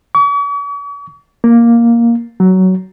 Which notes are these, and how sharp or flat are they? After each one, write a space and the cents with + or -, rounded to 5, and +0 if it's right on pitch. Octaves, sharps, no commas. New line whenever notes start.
C#6 +45
A#3 +5
F#3 +15